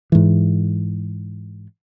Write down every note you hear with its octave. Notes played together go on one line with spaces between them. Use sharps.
G#2 E3